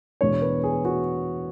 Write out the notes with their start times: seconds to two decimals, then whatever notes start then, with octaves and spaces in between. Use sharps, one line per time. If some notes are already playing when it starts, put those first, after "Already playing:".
0.21 E2 B2 G#3 B3 D4 C#5
0.42 B4
0.64 G#4
0.85 F#4